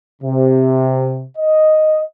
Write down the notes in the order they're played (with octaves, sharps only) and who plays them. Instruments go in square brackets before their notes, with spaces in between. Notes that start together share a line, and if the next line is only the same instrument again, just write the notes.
[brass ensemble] C3
D#5